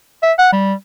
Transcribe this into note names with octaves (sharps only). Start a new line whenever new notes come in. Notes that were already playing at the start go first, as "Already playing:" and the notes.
E5
F#5
G3